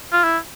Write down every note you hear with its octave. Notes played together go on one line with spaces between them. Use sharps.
F4
E4